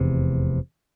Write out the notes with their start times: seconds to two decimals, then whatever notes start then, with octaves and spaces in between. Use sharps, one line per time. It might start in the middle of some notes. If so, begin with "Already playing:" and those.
Already playing: F1 E2 C3